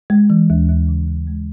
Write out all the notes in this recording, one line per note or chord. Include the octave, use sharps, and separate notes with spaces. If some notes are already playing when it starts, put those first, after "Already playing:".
G#3
E3
D#2
D#2
C#3
D#2
G#3